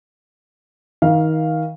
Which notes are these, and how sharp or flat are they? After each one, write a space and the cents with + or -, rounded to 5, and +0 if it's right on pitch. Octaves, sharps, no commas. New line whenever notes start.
D#3 +25 F5 +0